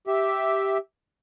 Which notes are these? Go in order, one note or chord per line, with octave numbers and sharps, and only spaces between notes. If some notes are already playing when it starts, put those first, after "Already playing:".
G4 E5